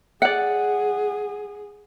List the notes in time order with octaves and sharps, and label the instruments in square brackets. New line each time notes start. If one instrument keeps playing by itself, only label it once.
[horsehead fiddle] G#4 [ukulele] D5 F#5